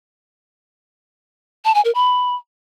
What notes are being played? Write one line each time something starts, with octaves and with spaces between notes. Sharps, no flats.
A5
G#5
A#4
B5